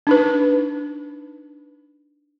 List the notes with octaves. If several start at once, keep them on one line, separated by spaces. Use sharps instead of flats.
D4 D#4 B4